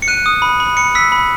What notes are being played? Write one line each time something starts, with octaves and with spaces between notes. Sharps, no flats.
C#7
F#6 D#7
D#6
B5
B5
B5 C#7
E6 B6
B5